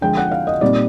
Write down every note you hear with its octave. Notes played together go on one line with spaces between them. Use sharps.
D3 F3 G#3 G5
F#5
F5
D#5
A#2 G3 C4 D#4 D5